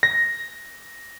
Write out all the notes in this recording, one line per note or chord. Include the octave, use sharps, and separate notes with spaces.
A#6